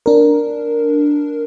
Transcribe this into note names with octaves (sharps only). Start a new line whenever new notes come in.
D4 A#4